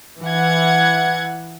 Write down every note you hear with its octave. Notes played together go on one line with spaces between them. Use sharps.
E3 F#5 G#6